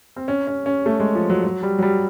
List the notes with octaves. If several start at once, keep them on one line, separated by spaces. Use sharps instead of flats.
C4
C#4
C#4
C#4
A3
G#3
F3
F#3
F#3
G3
F#3
G3